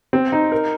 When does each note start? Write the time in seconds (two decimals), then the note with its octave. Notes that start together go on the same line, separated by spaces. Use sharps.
0.13 C4
0.32 D#4
0.52 A#4